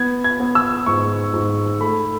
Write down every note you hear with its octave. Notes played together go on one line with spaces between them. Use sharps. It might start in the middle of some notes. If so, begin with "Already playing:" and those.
Already playing: B3 G#6
G#6
B3
E6
G#2 C#6
G#2
A3 B5